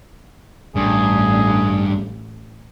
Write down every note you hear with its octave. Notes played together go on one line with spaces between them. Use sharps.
A1 G2 G#4